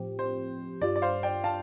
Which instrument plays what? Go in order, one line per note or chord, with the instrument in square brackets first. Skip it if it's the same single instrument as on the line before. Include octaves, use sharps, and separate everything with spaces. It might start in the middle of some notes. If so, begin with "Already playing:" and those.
Already playing: [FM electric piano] A2 F3 C4 G4
[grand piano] C5
[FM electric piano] G2 G3 F4 [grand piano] D5
[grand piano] D5
C5 F5
D5 G5
F5 A5